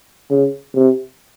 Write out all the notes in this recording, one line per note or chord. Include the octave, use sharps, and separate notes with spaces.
C#3
C3